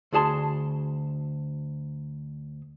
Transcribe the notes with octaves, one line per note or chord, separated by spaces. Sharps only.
D2 F#4 G#4 A5 C6